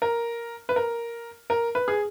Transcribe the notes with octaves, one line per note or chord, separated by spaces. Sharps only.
A#4
B4
A#4
A#4
B4
G#4